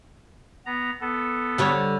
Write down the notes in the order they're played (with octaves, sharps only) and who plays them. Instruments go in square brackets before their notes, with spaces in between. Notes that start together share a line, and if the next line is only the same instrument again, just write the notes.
[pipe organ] B3 A#5
B3 A4
[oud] D3 G3 C#5